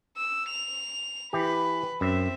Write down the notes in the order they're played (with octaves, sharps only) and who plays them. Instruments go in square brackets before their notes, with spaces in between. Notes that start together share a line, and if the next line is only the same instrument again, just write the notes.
[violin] E6
F7
[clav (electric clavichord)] E3 G4 [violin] B4 B5
[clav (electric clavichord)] F#2 [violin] C4 E5